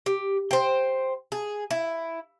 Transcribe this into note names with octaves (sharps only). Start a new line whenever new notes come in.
G4
C5 G5
G#4
E4